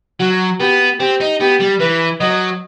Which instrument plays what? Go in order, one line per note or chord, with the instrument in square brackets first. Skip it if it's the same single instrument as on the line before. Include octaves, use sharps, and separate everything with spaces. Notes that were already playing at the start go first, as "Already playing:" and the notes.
[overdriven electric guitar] F#3 [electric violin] F#4
[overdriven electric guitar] B3 [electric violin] G4
[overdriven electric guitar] C4 [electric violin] G4
[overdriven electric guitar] D#4
[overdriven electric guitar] B3 [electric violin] G4
[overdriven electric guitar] G3
[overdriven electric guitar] E3 [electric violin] B4
[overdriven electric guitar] F#3 [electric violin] D#5